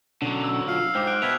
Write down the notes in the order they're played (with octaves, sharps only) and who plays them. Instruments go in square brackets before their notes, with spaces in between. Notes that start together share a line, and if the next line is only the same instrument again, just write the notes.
[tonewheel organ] B2 C#4 D4 [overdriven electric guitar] D3 F#3
[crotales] E6
[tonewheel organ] F4 [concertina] F5
[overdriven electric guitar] G#2 [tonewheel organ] C5 G5 [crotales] D6 F6
[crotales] F6 F#6 D7
[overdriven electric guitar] B2 [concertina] B4 E5 [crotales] G#6 F7